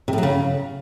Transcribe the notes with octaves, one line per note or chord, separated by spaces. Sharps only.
C3
A2
F#3
C#3